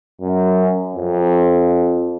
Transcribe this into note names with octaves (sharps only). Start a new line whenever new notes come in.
F#2
F2